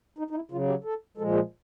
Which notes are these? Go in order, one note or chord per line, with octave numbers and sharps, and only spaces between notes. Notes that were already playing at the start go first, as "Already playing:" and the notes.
D#4
D#4
E4
C#3 F#3 F4
G4
A4
A#2 F3 G#3 A4
G#4